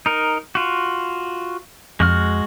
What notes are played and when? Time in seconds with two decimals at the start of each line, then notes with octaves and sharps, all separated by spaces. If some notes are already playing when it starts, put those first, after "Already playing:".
0.06 D#4 A#4
0.55 F4 F#4
2.00 F2 G#3 F#4 F6